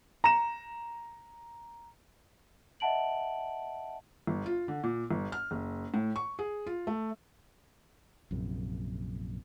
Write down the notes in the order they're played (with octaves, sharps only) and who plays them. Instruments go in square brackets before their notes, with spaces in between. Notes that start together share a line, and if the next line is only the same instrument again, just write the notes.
[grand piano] A#5 E7
[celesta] D#5 E5 F#5 A5 D7 F#7
[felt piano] G1
F4
D3
A#2
G1
F6
F#1
A2
C#6
G#4
F4
A3
[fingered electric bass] A#1 F#2 C3